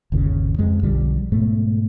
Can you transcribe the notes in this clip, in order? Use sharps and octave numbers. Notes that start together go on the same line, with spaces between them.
G1 D#2 C#3
F2 G#3
B1 D3 F3 G3
G#2 B2 A3